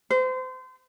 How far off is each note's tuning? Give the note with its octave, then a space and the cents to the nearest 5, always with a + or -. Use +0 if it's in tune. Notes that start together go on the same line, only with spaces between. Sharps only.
C5 -30